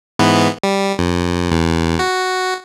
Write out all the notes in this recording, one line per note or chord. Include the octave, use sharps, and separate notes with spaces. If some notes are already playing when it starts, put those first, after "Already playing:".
G#2 E3 B3
G3
F2
E2
F#4